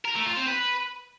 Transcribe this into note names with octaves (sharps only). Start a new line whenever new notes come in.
A#4
A3
F4
C4
B4